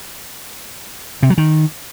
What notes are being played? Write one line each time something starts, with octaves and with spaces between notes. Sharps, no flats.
C3
F#3
D#3